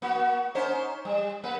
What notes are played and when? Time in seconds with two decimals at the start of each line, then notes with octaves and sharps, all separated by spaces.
0.02 A#3 F#4
0.55 C#4 D#4 C5
1.05 G3
1.44 A#3 B4